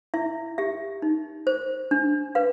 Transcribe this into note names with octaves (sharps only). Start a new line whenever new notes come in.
E4 E5
G4 E5
D#4
C5
D4
B4 F5